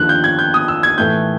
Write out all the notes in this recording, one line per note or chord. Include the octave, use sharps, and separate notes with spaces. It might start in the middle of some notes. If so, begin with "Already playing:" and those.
Already playing: D#2 D3 F3 F#6
G6
G#6
G6
D#6
E6
G#6
A2 E3 A3 G6